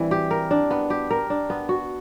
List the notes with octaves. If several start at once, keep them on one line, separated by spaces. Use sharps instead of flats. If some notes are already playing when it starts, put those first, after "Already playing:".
Already playing: E3 G3 C4 E4
G4
A#4
D4
B3
G4
A#4
D4
B3
F#4